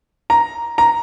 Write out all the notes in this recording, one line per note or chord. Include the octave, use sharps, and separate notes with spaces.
A#5
A#5